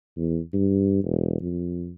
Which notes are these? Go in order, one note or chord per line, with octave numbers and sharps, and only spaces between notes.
E2
G2
E1
F2